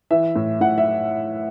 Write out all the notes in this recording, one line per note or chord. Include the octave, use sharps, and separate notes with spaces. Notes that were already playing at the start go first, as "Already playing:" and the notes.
E3 E5
A2
A2 F#5
E5